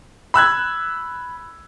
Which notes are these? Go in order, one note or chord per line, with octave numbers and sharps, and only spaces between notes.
B5 E6 F#6 G#6